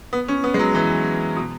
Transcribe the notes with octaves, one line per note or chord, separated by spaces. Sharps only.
B3
C#4
B3
G#3
F#3
E3
B2